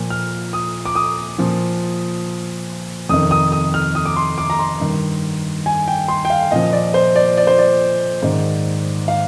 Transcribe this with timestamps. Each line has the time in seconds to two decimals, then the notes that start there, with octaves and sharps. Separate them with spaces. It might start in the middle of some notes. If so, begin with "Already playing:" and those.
Already playing: A#2 F3
0.10 F6
0.53 D#6
0.85 D6
0.95 D#6
1.38 A#2 F3
3.09 F2 C3 D#3 D#6
3.31 D#6
3.52 D#6
3.74 F6
3.95 D#6
4.06 D6
4.17 C6
4.38 D6
4.50 A#5
4.59 C6
4.80 G2 D#3
5.66 G#5
5.88 G5
6.08 C6
6.25 G5
6.30 F5
6.51 A#2 F3 D#5
6.73 D5
6.94 C5
7.16 D5
7.37 D5
7.47 C5
7.59 D5
8.23 G#2 D#3
9.08 F5